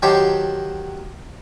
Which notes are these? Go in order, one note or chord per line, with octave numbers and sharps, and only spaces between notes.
D#3 F#3 G4 C5 C#5 A5